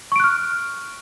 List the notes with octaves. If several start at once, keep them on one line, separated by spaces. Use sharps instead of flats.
C#6 F6 F#6 D7